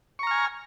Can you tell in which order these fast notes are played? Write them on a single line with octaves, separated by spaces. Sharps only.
C#6 A#5 F6 G#5